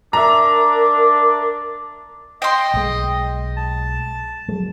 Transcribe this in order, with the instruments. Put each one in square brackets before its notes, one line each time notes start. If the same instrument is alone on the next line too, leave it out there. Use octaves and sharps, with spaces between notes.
[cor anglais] D4 [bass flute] A#4 [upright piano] E5 A#5
[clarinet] D#5 [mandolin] G5 C6
[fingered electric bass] B1 G#3
[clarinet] A5
[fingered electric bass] F#3 G#3